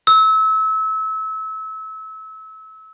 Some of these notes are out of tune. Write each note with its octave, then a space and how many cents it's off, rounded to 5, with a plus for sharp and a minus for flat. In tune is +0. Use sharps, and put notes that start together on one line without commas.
E6 -30